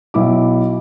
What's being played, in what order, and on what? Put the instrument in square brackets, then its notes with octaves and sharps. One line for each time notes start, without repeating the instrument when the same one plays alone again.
[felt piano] B1 E4 D6